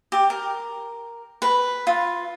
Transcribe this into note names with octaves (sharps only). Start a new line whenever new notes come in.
G4
A#4
B4
F4